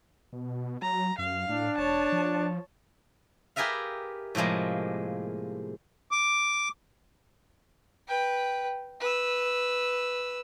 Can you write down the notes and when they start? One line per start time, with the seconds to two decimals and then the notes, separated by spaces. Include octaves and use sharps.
0.33 B2
0.82 F#3 A#5
1.19 F#2 F5
1.49 A2 D4
1.78 E1 C#5 A5
2.12 F3
3.56 G4 G#4 A#4 B4 E5 F5
4.35 A2 C3 F3 G#3 A#3
6.11 D6
8.08 B4 G5
9.00 B4 E6